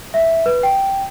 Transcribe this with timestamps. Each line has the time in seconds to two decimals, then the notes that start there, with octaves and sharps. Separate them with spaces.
0.14 E5
0.46 B4
0.63 G5